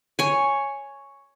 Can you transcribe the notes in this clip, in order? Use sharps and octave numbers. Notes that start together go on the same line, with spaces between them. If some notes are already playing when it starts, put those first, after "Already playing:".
C#5 G#5